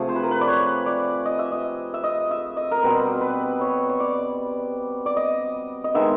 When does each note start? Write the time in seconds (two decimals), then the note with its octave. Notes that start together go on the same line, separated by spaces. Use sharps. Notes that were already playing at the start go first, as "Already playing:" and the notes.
Already playing: C3 F3 A3 G#4
0.09 C5
0.16 B4
0.24 A#4
0.31 B4
0.41 D5
0.47 C#5
0.86 D5
1.25 D#5
1.39 E5
1.52 D#5
1.94 E5
2.04 D#5
2.31 E5
2.57 D#5
2.71 A#4
2.83 B2 G3 C4 B4
3.21 B4
3.61 C#5
3.89 C#5
4.00 D5
5.06 D5
5.17 D#5
5.84 D#5
5.95 D#3 G#3 B3 E5